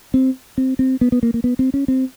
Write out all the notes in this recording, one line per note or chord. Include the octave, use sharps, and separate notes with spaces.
C4
C4
C4
B3
B3
A#3
A#3
B3
C4
C#4
C4